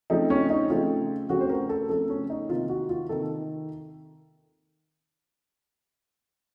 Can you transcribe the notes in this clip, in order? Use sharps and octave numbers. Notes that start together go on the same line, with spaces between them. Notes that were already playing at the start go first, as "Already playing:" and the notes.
C#3 F3 A3 C4 D#4
C#4
D#4
C#3 F3 A3 C4 F4
C#3 F3 A3 C4 F#4
C5
A#4
A4
C#3 F3 A3 C4 A4
C#4
D#4
C3 D#3 A#3 F4
F#4
F4
C3 D#3 A#3 A4